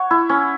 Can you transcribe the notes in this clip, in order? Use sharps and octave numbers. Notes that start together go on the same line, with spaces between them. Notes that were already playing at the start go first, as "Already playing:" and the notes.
Already playing: C#5 F#5
E4
C#4